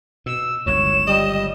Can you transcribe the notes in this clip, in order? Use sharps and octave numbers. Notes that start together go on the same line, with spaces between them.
B2 E6
G1 C#2 F#2 C#5 E7
G3 D#5